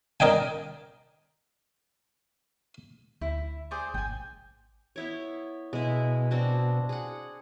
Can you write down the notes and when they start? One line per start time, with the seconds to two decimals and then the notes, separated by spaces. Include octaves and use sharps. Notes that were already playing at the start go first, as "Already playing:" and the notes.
0.20 A#4 D5 D#5 G5 G#5
3.21 D2 E4
3.71 G#4 C5 D5
3.94 G#1 G5 G#5
4.96 B3 E4 C#5
5.73 B2 G#3 E4
6.31 C4 D4 F#4
6.89 G#4 F#5